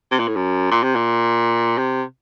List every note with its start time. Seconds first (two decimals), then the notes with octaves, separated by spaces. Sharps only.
0.11 C3
0.20 A#2
0.28 A2
0.36 F#2
0.71 A#2
0.83 C3
0.96 A#2
1.78 C3